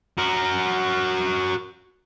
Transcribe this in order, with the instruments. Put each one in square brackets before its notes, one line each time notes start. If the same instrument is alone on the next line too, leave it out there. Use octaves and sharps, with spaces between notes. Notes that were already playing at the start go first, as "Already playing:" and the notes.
[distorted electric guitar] F#4 A#4